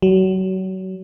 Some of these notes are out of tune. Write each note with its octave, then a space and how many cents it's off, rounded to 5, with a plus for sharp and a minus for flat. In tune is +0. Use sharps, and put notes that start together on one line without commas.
F#3 +30